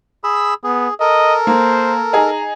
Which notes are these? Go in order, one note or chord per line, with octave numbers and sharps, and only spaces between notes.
G#4 B5 E6
B3 G#4
A4 A#4 D#5
A#3 C5
D#4 G#4 A#5